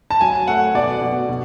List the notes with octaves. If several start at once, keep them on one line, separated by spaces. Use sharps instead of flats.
A5
F#3 G#5
A3 F#5
B2 D5
B2
B2